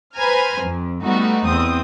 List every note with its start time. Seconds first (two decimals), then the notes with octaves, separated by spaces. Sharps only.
0.15 B4 C5 G#5 A#5 F6
0.62 F2
1.04 G3 A3 B3 D#4 F#4
1.44 E2 C4 D#6